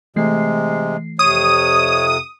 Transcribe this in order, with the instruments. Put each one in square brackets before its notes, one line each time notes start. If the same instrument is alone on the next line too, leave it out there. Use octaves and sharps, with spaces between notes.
[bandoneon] C3 G#3 [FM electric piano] E3 A3 C7
[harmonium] F2 C3 [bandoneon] C#5 [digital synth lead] D#6